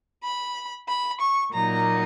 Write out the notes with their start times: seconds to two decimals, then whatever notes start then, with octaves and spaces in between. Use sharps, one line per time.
0.23 B5
0.89 B5
1.21 C#6
1.53 A#2 F#3 A#3 D#4 A#5